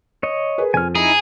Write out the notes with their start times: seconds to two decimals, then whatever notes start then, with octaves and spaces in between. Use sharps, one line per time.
0.23 C#5 D#5
0.58 G#4 A#4 B4
0.74 F2 G#5 F6
0.95 D#4 E4 G#4 A#5